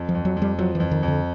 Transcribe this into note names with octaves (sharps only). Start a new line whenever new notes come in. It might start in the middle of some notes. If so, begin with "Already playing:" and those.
Already playing: F2
F3
F2
F#3
F2
G3
F3 F#3
F2 E3
D#3
F2
D3